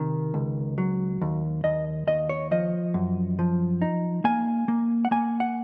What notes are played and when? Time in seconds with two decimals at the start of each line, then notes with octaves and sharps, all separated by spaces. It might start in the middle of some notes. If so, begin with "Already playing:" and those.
Already playing: C3 D#3
0.34 C#2
0.78 F#3
1.21 D#2
1.64 D#2 D#5
2.07 D#2 D#5
2.29 C#5
2.51 F3 D#5
2.94 F#2
3.39 F3
3.82 D#4
4.24 A#3 G#5
4.68 A#3
5.05 F#5
5.11 A#3 G#5
5.40 F#5